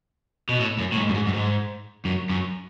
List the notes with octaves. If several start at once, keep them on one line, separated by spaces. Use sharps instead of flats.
B2
A2
F#2
A2
G#2
F#2
G#2
F#2
G#2
F#2
F#2